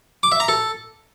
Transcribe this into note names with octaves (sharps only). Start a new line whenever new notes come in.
D6
E5
A#5
A4